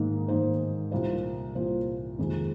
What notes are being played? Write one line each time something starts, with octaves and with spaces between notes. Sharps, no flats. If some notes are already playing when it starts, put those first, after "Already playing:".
Already playing: G#2 D#3 A#3 D#4
G#2 D#3 A#3 D#4 C5
C2 A#2 A#3 F4 C5
C2 A#2 A#3 F4 C5
F2 C3 D#3 G#3 C4